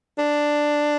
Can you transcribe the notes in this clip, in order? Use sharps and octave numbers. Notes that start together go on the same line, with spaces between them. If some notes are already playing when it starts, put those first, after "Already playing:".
D4